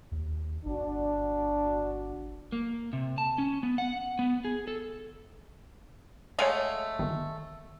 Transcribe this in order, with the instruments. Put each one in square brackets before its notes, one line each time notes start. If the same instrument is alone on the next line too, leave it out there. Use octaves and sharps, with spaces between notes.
[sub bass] D#2
[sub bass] G1 [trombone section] D4 F#4
[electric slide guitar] A#3
C3
A5
C#4
B3
F#5
B3
G#4
A4
[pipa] G#3 A3 F5 [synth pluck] C#5 F#5 G#5
[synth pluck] G1 D#3